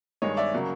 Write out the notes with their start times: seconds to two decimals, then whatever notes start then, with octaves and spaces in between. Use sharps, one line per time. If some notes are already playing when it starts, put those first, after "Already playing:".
0.22 G2 D#3 G#3 C#5 D#5
0.37 D5 E5
0.53 C#3 F#3 A#3